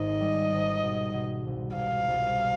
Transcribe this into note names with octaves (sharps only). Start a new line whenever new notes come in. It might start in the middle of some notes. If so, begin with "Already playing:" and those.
Already playing: G#1 G#2 D#5
G3
G#1
B2
B2
C2
B2 F5
C2
B3